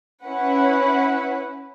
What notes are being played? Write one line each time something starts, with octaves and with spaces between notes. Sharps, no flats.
C#4 E4 B4 F#5